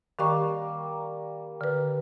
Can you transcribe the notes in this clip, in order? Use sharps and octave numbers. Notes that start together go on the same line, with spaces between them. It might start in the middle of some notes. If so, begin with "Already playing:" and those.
D#3 G3 A#3 C#6 D6
D3 B4